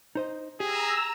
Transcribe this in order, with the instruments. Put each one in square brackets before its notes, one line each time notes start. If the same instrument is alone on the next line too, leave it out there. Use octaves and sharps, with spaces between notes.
[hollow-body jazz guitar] D#4 C5 D#5
[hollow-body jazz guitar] G4 [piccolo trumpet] G#4 [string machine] A#5 E6